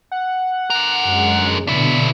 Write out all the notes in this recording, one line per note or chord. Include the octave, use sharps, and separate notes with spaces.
F#5
D3 A#4
F#2 G#3
B2 D3 D4 E4 B6